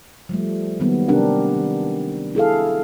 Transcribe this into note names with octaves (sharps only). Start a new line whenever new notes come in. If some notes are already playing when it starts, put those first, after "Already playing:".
F3 G3 A3
D#3 F#3 G3 A#3 B3
C3 C4 D4 G4 A#4 F#5
D#3
E4 G#4 A4 F5